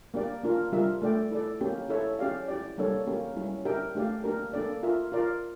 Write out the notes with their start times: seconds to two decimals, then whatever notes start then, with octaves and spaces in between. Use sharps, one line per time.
0.14 A#3 D4 G4 D5
0.43 A#3 D4 F4 A#4
0.72 G3 D4 F4 A#4 E5
1.02 A3 D4 A4 D5 G5
1.31 E4 A4 D5
1.61 A#3 C#4 G4
1.89 E4 A4 C#5 E5
2.19 C#4 G4 D5 F5
2.48 E4 G4 D5
2.78 G3 A#3 D4 A4 C#5
3.07 A#3 C#4 G4
3.36 G3 C#4 E4
3.65 D4 G4 A#4 E5 G5
3.95 A3 D4 G4 D5 F5
4.24 A#3 D4 G4 A#4
4.53 A#3 D4 A4 D5
4.83 F4 A#4 E5
5.12 F4 A#4 D5 F5